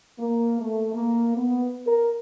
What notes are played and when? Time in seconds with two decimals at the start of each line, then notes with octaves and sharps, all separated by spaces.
0.19 A#3
0.60 A3
0.93 A#3
1.37 B3
1.86 A#4